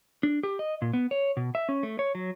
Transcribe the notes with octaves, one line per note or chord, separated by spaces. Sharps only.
D4
G4
D#5
A#2
B3
C#5
B2
E5
C#4
A3
C#5
F#3